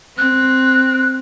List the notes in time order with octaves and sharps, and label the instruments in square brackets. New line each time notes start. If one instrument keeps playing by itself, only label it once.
[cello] C4 [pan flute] F#6